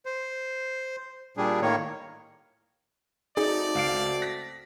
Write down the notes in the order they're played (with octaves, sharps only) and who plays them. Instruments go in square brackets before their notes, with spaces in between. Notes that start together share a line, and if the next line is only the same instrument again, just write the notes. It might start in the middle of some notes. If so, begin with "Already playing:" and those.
[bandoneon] C5
A#2 G3 D4 G#4
A2 D#3 A#3 C#5
[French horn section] A3 C4 F#4 [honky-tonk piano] D#4 [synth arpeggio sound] G#4 [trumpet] D5
[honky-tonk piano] C#2 F5 D7
A#6 B6